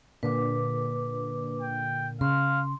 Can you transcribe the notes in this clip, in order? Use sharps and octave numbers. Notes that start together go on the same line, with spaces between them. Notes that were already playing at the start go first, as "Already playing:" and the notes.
A#2 D3 B4 D6
G5
C#3 F5 C6